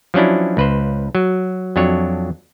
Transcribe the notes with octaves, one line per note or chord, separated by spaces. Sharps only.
F3 F#3 C#4 D4 E4
C#2 B4 C5
F#3
F2 F#3 D4 C#5